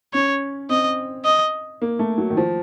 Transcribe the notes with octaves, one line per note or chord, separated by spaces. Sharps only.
C#4 C#5
C4 D#5
D#5
A#3
A3
F#3
D#3
F3